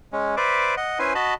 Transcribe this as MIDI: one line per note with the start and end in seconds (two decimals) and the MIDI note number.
0.13 0.35 56
0.13 0.35 61
0.37 0.75 71
0.37 0.75 72
0.37 0.75 74
0.37 0.75 76
0.37 0.75 86
0.77 0.99 75
0.77 0.99 78
0.99 1.13 61
0.99 1.13 64
0.99 1.13 71
0.99 1.13 72
0.99 1.13 80
1.15 1.34 66
1.15 1.34 75
1.15 1.34 81
1.15 1.34 83